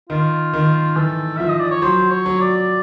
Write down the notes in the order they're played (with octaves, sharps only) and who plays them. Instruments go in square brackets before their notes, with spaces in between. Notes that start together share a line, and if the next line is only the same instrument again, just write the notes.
[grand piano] D#3 [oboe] F4
[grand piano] D#3
[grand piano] E3 [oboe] A4
[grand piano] F3 [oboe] E5
[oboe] D#5
D5
C#5
[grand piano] F#3 [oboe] C5
[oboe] C#5
[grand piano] F#3
[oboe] D5